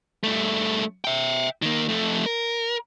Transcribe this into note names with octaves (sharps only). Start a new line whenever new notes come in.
G2 A3
E5 G5
D#3 A#3
F2 A3
A#4